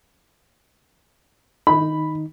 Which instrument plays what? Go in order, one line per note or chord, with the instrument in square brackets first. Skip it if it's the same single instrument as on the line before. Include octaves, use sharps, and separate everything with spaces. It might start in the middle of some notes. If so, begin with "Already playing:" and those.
[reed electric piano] D#3 D#4 [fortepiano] B5